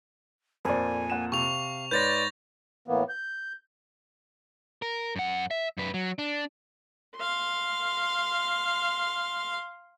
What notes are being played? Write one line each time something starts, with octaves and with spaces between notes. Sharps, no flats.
F2 A#2 A#4 C5 D5 G#5
A#3 F#5 E7
C3 F5 C#6 F7
G#2 B4 C#5 D5 C6 G6 A6 A#6
A2 E3 A#3 B3
G6
A#4
F#2 F#5
E5
F#2 B4
F#3
D4
F5 C6